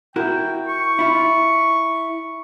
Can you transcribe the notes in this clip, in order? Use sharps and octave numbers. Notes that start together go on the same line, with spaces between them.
E4 F#4 A#4 G5
C#6
E4 F4